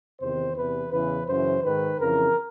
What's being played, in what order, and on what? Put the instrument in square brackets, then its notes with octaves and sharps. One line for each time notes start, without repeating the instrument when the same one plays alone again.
[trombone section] E2 C3 D#3 C5
E2 C3 E3 B4
E2 C#3 E3 B4
F#2 C#3 E3 C5
G#2 D#3 B4
F2 C#3 E3 A#4